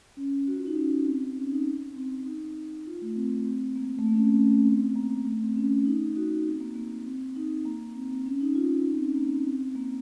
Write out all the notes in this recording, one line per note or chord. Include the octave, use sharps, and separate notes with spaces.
C#4
F#4
F4
D#4
C#4
C4
C4
C#4
D#4
C4
D#4
F4
A3
C4
C4
A#3
A3
A#3
C#4
C4
C#4
C4
A#3
A3
C4
C#4
D#4
D#4 F#4
D#4
C4
A#3
A#3
C4
D#4
A#3
C4
C4
C#4
D#4
F4
D#4
C4
C#4
A#3
C4
A#3